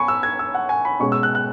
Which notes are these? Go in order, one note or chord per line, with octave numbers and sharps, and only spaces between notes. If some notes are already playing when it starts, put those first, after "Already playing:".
Already playing: B3 G#5 B5 C#6
E6
G#6
E6
F#5
G#5
B5
B2 G#3 C#4 C#6
E6
F#6
F#6